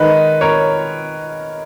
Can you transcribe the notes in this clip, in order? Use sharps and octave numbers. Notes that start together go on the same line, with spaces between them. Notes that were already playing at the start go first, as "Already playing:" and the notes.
Already playing: D#3 G#3 D#4 B4 D#5
A#4 C#5